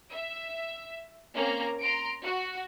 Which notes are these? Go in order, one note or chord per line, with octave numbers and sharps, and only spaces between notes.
E5
A#3 C4 C#4 A#5
A#5 C6 D7
F#4